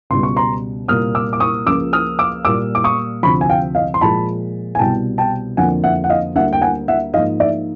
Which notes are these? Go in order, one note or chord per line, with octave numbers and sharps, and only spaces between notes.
C#2 B2 G3 C6
C#6
A#5 C6
C2 A#2 G3 A#3 D#6 F6
D6 E6
D6
C#6 D#6
C#2 C#3 F3 A#3 D6 E6
D#6 F6
D6 E6
A#2 G3 A#3 D6 E6
D6
C#6 D#6
D2 C3 F3 B5 C#6
G#5
F5 G5
D#5 F5
C6
A#2 F3 G#3 A5 B5
G#5
C2 B2 G3 G5 A5
G5 A5
F2 D3 F3 A#3 F#5 G#5
E5 F#5
F#5
D#5 F5
D2 D3 G3 A#3 E5 F#5
G5
F#5 G#5
E5 F#5
G#2 F3 A#3 D#5 F5
D5 E5